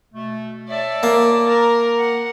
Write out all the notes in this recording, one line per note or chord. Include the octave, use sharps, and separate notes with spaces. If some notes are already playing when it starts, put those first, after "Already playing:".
B2 A3
C#5 D5 E5 A5
A#3
A#4 A#5
F#5